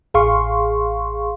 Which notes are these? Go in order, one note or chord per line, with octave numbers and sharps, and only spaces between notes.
A1 G#4 F5 C6 C#6